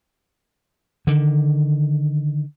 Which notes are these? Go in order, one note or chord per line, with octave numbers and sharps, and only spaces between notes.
D3 D#3